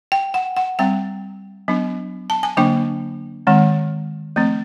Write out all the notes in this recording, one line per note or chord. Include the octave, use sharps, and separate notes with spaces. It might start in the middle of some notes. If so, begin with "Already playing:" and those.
G5
F#5
F#5
G3 C4 G5
F#3 B3 D4
A5
G#5
D3 F#3 A#3 D4 G5
D#3 G#3 C4
F3 A3 C4